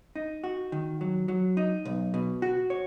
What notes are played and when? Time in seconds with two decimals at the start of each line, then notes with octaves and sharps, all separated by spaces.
0.16 D#4
0.44 F#4
0.72 D#3
1.01 F#3
1.28 F#3
1.57 D#4
1.85 B1
2.14 B2
2.42 F#4
2.70 C#5